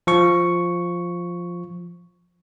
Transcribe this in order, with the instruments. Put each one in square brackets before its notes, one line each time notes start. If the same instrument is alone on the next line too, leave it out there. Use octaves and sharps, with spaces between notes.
[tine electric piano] F3 C#6